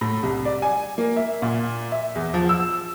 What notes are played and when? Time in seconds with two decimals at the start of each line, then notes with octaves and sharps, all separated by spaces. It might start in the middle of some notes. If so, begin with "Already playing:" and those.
0.01 A2
0.23 C2
0.45 D5
0.62 G#5
0.98 A#3
1.16 E5
1.42 A#2
1.92 E5
2.15 E2
2.34 F3
2.49 E6